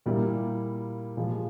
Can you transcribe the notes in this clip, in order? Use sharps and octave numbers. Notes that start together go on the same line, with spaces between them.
A#2 G3 A#3 E4
A#2 F3 G#3